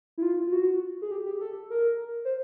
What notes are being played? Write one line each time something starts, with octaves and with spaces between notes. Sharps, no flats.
E4
F4
F4
F#4
G#4
G4
G4
A4
A#4
C5